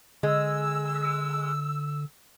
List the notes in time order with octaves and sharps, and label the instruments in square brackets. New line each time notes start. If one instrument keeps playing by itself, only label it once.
[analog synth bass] D3 [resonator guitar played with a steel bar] G#3 [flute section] E6